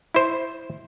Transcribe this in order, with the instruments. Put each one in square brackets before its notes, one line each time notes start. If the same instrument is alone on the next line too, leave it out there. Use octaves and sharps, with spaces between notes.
[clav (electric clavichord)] E4 C5